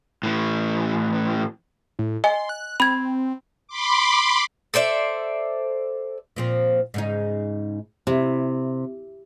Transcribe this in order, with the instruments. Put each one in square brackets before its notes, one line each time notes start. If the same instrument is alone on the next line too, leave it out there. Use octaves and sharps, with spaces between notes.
[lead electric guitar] A2 E3
[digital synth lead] A2
[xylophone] D#5 G#5 [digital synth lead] C6
[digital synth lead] F#6
[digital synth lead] C4 [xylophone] B5 G#6
[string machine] B5 C6 D6
[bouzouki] A4 C5 D5 E5
[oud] A#2 F3 C4
G#2 C#3 D#4
[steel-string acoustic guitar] C3 [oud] E4